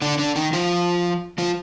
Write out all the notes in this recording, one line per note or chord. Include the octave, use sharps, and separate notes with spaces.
D3 D4
D3 D4
D#3 D#4
F3 F4
F3 F4